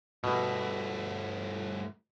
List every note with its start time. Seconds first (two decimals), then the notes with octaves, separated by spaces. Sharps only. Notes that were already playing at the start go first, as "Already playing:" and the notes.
0.24 G2 B2 A3